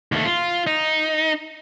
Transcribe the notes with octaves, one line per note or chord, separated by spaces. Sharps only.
D#2 A3
F4
D#4